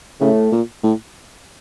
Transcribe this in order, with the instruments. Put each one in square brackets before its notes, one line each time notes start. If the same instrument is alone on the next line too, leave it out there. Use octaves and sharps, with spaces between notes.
[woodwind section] A2 A3 [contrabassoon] C#3
[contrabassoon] A#2
A2